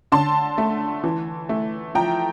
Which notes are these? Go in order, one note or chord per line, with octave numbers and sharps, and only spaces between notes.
D3 A5 C6
A3
E3
A3
F3 G5 A#5